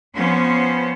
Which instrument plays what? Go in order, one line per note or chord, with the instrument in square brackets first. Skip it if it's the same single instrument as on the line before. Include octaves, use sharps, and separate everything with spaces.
[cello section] F3 B3 C#4 C5